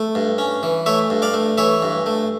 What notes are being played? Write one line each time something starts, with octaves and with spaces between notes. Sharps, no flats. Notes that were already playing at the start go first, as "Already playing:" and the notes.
Already playing: A3
G2
C#4
E3
A3 C#5 E5
G2
D5 F5
A3
E3 C#5 E5
G2
A3